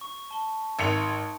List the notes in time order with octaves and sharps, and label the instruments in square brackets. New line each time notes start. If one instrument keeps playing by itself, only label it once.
[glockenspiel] C#6
A5 G7
[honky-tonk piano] G#1 C#7 F7